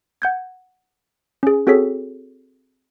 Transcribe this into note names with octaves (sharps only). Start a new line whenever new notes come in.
F#5 G6 G#6
C#4 G#4
C4 F#4 G#4 A4 C#5 B6